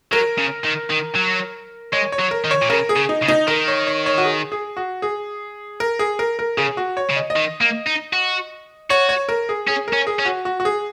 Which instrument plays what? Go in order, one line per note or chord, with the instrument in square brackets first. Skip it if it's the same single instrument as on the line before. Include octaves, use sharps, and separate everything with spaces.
[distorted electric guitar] F#3 [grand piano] A#4
[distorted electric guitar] C#3
D#3
D#3
F#3
[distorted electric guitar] G#3 [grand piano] C#5
[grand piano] C#5
[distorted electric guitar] F#3
[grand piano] A#4
[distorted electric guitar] D#3
[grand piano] C#5
[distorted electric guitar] A#2
[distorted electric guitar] C#3 [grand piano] A#4
[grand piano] G#4
[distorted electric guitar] C#3
[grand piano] D#4
[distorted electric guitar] C#3
[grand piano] D#4
[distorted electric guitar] D#3 [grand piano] A#4
[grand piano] C#5
C#5
C#5
F#4
G#4
G#4
F#4
G#4
A#4
G#4
A#4
A#4
[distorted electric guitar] C#3 [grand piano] G#4
[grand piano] F#4
C#5
[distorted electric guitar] C#3
[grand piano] D#5
D#5
[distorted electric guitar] D#3
A#3
D#4
F#4
[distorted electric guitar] F#4 [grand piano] C#5
[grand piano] C#5
A#4
G#4
[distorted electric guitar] C#4 [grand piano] G#4
[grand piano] A#4
[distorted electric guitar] C#4
[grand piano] G#4
[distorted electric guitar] C#4
[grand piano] F#4
F#4
F#4
G#4